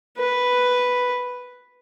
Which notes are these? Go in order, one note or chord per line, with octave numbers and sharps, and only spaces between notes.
B4